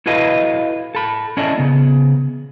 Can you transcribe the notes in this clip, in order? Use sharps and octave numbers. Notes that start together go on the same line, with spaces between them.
E4 F#4 A4 B4 D#5 F5
A4 B5
C#4 E4 A4 D5 D#5
C#3 B3